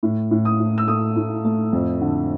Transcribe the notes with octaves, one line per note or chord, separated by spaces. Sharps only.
A2
A2
D#6
A2
E6
A3 D#6
A2
A3
F2
D3